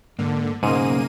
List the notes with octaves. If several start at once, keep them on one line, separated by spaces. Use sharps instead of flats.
G#2 D3 A#3
B1 G#2 C#3 A#3 G#4 D#7